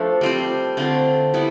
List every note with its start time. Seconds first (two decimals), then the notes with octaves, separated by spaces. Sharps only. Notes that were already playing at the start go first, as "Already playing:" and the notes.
Already playing: F3 A3 D4 A4
0.21 G3 C4 F4 C5
0.77 D3 A3 C4 F4
1.34 G3 B3 E4